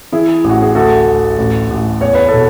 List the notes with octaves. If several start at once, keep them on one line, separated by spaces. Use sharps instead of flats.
E3 E4 G#4
A1
F#4
G#4
D2 F#4 A4
D2
A1
A1
E2 C#5
B4
B2 A4